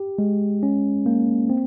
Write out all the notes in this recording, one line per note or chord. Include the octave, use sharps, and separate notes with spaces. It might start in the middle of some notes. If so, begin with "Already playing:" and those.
Already playing: G4
G#3
C#4
A#3
C4